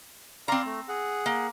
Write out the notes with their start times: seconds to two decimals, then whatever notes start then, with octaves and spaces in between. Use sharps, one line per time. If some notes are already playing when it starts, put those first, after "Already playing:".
0.48 C4 D5 F5 A#5 C6
0.65 A3
0.88 G#4 F#5
1.26 A#3